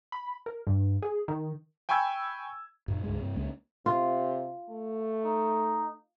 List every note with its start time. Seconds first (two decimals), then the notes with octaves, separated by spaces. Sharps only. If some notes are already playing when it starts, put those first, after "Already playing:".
0.12 B5
0.46 A#4
0.67 G2
1.02 G#4
1.28 D#3
1.89 G5 G#5 B5 C#6 E6 G#6
2.88 F#2 A#2
3.03 C#2 G2 G#3
3.20 G2 C3
3.36 C#2 G#3 A#3 C#4
3.86 C3 F4
4.69 A3
5.25 D#4